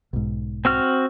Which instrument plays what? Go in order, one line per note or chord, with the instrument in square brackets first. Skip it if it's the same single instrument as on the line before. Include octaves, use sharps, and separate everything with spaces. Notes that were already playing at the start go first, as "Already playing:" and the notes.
[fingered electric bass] B1 G#2
[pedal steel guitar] C4 F#4 F6